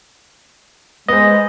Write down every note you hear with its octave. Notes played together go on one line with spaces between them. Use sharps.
G#3 B3 C5 D#5